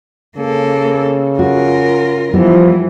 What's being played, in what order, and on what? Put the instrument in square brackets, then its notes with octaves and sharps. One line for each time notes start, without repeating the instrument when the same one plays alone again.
[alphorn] C#3 [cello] A#3 A4
[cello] F4 A#4 [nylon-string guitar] F#4
[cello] E3 [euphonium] F3 [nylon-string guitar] G3 B3 E4